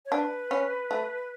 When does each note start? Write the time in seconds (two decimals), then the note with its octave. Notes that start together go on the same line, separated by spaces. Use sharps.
0.06 C#5
0.11 D4 B4
0.51 C#4
0.91 A3